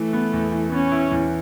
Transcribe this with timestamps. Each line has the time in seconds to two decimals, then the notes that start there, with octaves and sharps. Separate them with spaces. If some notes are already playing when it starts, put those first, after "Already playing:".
Already playing: E3 A3
0.13 B3
0.33 E2
0.52 E3
0.72 B3 C#4
0.92 E4
1.11 E2